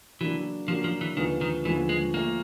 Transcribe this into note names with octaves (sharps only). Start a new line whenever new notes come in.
C#3 E3 F#3 A#3 D4
C#3 F3 F#3 A#3 D4
F3
E3
D#2 D3 D#3 F3 G#3 B3
D#3
D#2 D3 E3 F3 G#3 B3
G#3
A#2 F3 A3 A#3